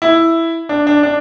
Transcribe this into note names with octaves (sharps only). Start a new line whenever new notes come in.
E4
D4
D4
D4